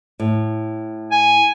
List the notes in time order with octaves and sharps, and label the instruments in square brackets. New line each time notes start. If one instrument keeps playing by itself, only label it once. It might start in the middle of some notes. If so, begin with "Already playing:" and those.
[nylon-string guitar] A2
[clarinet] G#5